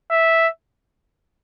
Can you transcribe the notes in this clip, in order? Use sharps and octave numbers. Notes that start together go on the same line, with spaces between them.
E5